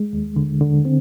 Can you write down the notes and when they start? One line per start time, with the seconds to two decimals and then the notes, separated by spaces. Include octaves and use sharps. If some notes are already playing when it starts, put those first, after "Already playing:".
Already playing: G#3
0.13 D#2
0.36 D3
0.61 D3
0.85 C4